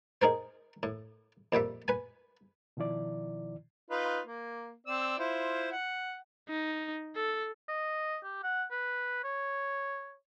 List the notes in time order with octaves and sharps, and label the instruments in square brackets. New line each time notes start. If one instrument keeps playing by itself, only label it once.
[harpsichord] D#4 G#4 A#4 C5
A2
F2 A#2 G3 E5
B4 G#5
[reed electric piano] B2 D#3 F3 E4 D5
[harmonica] D#4 F4 B4
A#3
C4 D5 E6
E4 F4 C5
F#5
[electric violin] D#4
A4
[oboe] D#5
G4
F#5
B4
C#5